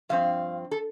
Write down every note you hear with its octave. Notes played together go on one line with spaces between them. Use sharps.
G2 F3 C4 F5
A4